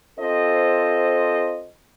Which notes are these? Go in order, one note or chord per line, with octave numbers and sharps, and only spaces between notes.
C4 F4 A4 C5 D#5